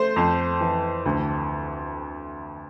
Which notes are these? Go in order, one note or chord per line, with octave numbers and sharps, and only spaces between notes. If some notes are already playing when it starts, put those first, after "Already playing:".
Already playing: A3 C5
F2
E3
D2